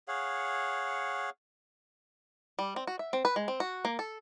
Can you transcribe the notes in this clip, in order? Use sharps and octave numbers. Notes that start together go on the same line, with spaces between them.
G#4 C#5 F5 F#5
G3
C4
F#4
E5
C4
B4
G#3
C4
F#4
A#3
A4